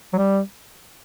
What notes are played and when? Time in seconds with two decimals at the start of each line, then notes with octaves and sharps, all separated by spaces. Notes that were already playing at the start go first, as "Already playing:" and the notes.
0.13 F#3
0.18 G3